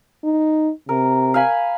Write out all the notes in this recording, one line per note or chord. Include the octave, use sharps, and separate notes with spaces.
D#4
C3 A#4
F5 G#5 B5